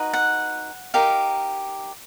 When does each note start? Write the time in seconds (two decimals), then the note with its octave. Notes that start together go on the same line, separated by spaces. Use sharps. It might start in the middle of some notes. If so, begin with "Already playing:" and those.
Already playing: D#4 F#4 B4
0.13 F#5
0.94 D#4 G4 A#4 F5